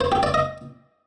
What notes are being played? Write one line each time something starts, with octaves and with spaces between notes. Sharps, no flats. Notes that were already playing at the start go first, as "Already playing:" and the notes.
C5
G4
D5
D#5